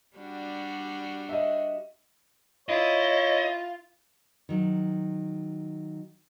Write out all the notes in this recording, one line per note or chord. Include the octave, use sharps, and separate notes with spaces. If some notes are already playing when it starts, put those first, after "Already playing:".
G3 D4 F#4
D#5 E5
E4 F4 C#5 D#5
D#3 F#3